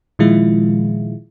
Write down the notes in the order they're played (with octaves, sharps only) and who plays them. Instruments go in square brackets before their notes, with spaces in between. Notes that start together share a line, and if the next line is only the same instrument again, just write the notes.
[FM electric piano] A#2 D#3 F3 G#3 E4 F4